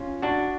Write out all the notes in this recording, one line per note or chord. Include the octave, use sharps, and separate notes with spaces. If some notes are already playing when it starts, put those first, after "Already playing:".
Already playing: C#4 F4
D4 F#4